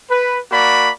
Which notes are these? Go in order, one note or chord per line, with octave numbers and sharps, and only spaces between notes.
B4
A#3 F#4 D5 B5